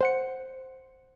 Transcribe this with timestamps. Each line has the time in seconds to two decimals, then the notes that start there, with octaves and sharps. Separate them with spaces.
0.01 C5 F#5 C#7